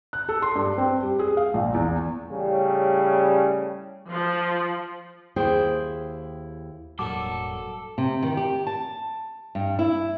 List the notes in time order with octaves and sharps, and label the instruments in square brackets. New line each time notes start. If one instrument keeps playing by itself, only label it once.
[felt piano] F#6
A4
C6
G2
C4
G3
G#4
F5
A#1
E2
[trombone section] A2 C#3 G3
[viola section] F3
[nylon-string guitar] D#2 E4 G#4 C5 G5
[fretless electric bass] E1 A2 G3 [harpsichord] F#3 A#3 D4 [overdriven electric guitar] A4 [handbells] D6
[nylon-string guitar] C3
D#3
G4
A5
G2
E4